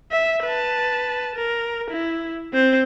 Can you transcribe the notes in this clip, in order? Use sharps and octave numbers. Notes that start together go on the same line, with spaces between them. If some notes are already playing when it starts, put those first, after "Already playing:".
E5
B4 A5
A#4
E4
C4 C5